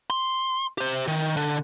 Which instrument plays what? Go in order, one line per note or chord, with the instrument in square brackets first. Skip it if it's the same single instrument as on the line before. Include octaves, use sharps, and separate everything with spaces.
[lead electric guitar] C6
G4 C5
D#3
D3